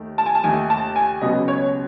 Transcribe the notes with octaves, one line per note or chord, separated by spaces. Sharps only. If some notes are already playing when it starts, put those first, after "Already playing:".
Already playing: D#2 D#3 A3
A5
G#5
A5
D#2 D#3 A3 G#5
A5
G#5
C#2 B2 F#3 C#4 D#5
C#5